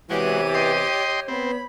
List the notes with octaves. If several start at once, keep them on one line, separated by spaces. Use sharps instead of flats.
E2 C3 E3 G#3 F#4 G4 C#5 D#7
D#5 G5 C6
B3 C4 B5